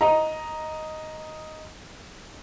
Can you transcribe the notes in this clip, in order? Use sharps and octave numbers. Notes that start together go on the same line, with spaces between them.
D#5 A#5